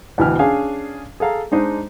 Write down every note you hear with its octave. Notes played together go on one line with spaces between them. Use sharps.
D2 B2 E3 G5 G#5 F6
C#4 D4 G#4 F5 G#5
G#4 A4 F5 A#5
G#3 D4 D#4 C5 D#5